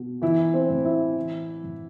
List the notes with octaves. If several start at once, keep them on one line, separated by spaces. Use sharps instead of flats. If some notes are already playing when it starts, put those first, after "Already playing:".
Already playing: B2
E3 E4
C4 C5
A2
E4 E5
E3
A2